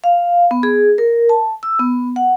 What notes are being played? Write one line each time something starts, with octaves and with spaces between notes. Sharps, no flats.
F5
B3
G#4
A#4
A5
E6
B3
F#5